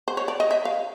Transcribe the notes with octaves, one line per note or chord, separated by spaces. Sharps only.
C5
C#5
D5
D#5
E5
F5